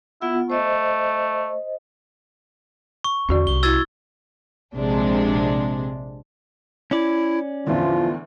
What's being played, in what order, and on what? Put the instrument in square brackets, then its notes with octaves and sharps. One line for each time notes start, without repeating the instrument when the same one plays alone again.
[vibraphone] B3 F4 F#5 [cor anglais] E4
[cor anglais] A3 [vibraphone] C5 D#5
[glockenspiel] C#6
[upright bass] E2 D3 [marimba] C#4 F#4 D5
[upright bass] C2 [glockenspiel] G7
[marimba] E4 F#4 [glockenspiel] E6 G#6 A6
[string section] A#1 C3 G#3 D4
[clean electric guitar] C#4 D5 [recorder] E4
[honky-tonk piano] E2 A2 D3 [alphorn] F3 [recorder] F4